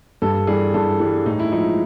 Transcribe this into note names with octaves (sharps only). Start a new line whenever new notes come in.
G2 A4
E3 G3 G#4
G2 A4
E3 G3
A2 D#4
E4
F3 G#3 D#4